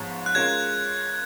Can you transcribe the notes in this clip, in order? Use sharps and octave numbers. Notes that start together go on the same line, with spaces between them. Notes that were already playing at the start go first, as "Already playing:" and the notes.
Already playing: G#2 F3 B3 C#5
F#6
G#3 C#4 F4 A#4 G#6